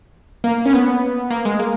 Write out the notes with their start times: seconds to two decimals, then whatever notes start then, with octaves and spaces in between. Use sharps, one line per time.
0.44 A#3
0.66 C#4
0.73 B3
1.30 A#3
1.45 G#3
1.60 A#3